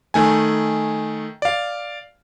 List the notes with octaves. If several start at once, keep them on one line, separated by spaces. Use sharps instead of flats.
D#3 A3 G#5
D5 F5